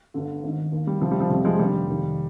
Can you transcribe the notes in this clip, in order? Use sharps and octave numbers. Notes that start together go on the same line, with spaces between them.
G1 G2 D3
G#1 G#2 D#3
D#2 D#3
G3
C2 C3 D#3 F3
G3
F3
F1 F2 C3 G3
F3 G#3
F1 D#2 D3 G3
F1 D#2 D#3